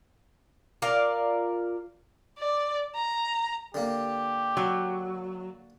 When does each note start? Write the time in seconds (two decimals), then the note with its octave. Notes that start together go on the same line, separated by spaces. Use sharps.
0.82 F4 A#4 D5 F5
2.39 D5
2.95 A#5
3.74 D3 A#3 G4
4.57 F#3